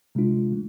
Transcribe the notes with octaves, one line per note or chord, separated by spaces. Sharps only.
C3 G#3 D4 F4
E3 A3